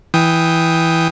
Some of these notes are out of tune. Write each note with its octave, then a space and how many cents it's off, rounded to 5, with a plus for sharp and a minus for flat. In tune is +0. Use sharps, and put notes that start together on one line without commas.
E3 +0 G5 +0 D#6 +0